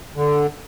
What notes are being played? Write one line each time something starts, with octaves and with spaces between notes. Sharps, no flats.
D3